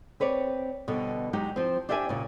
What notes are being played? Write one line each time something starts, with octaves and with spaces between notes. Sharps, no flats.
C4 B4 C#5 D5
B2 D3 G3
F#3 G#3 D#4 G4
F3 C4
D4 G4 D5 E5 G5 G#5
A#2 C#3